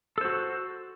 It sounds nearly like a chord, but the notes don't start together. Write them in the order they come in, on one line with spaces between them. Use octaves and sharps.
A4 C5 F#4